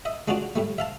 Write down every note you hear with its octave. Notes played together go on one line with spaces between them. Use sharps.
D#5 E5
G#3 D4 F4 F#4 D5
A2 G3 A3
E5 F5 A5